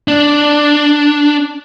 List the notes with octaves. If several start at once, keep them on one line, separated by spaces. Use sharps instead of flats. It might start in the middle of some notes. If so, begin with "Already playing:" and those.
D4